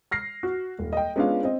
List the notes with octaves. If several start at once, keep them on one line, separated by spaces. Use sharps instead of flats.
F6 A#6 C7
F#4
D#1
D#5 G5
G#3 B3 C#4 D4 F4 F5
C4 D#5